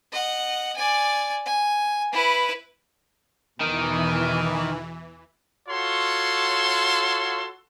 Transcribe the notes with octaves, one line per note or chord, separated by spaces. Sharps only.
D#5 F#5
D5 G#5
G#5
E4 B4
E2 B2 D#3 E3
F4 F#4 A4 C#5 C6